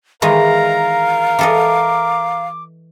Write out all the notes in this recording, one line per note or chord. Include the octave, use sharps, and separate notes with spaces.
D#3 E3 G#3 A#4 F5 A#5
E3 A4 D#5 D6